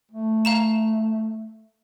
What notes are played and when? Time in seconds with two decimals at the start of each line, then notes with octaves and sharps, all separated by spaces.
0.11 A3
0.45 F5 A#5 E7